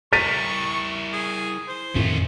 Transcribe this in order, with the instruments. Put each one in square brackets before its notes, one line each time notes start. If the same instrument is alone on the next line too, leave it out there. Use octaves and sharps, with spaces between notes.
[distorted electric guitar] E4 A#4 [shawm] C#6 [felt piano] A6 B6 D#7
[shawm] G#4
C5
[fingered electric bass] F2 A2 D#3 [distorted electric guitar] A3 C#4